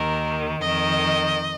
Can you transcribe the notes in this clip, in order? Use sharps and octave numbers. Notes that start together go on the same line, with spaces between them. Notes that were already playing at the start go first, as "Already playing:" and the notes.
Already playing: D#2 D#3 A#4
F2 D#3 D#5